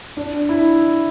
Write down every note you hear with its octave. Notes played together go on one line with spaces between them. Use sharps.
D4
E4